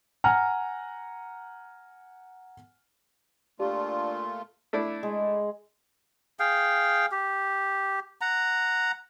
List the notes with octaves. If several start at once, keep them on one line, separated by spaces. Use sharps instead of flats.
F#5 G#5 A#5 F6
A#2 A3 D4 F4 G4
A3 D4 E4
G#3
G#4 F5 G5
G4
F#5 A#5